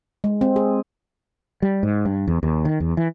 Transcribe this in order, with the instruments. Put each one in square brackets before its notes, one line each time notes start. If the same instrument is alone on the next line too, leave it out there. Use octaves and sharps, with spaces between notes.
[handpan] G#3
C4
G#4
[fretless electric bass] G3
G#2
G2
E2
D#2
D#3
E2
E3